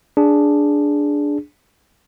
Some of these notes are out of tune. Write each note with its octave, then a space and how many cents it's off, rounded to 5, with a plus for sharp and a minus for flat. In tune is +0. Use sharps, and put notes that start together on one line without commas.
D4 -5 G#4 +0